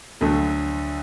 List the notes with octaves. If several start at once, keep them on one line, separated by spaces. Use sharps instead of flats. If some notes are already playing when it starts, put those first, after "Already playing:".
D2 D3 F#3 A3